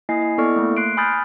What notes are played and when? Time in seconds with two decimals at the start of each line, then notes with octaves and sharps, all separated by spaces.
0.09 A#3 E4 D#5 G#5 C7
0.21 D#5
0.38 B3 E4 A4 D5 C#6 F6
0.56 A3 A#3
0.77 C6 F#6 C7 D7
0.97 G#5 B5 D#6 F6 G6 A6